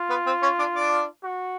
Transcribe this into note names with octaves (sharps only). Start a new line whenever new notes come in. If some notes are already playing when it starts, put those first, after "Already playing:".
Already playing: F4
B3 B4
C4 C5
C#4 C#5
D4 D5
D4 D5
F#4